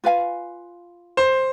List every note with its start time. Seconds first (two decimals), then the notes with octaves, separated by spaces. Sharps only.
0.04 F4 B4 F5 G#5
1.17 C5